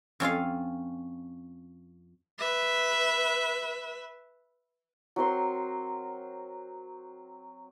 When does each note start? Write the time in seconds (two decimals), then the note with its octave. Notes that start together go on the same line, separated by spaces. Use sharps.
0.20 F2 C#4 F4 F5
2.39 B4 E5
5.16 F#3 C4 A#4 C6